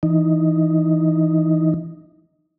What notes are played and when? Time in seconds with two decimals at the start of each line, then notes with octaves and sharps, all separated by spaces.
0.03 E3 D#4